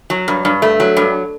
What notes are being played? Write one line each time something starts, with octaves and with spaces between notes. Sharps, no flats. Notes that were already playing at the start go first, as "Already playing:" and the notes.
F#3
G2
G2
A3
F#3
G2